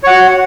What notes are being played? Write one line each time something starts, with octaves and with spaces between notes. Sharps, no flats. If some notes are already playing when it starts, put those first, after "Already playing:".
F#4 C#5 F#5